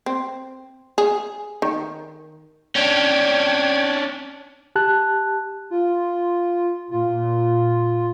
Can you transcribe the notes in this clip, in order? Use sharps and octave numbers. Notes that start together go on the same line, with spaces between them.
C4
G#4
D#3
C#4 D4 G5 G#6
G4 A5 F#6
F4
A#2 F4